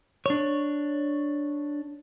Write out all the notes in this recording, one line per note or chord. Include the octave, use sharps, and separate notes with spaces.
D4 C#5